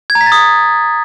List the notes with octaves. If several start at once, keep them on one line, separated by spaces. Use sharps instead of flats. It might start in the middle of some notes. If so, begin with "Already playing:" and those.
G#6
A#5
B6
A6
D#6